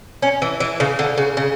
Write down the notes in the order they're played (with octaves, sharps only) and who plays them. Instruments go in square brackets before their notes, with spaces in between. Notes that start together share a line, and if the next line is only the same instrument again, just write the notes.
[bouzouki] C#4
E3
E3
C#3
D3
C#3
C#3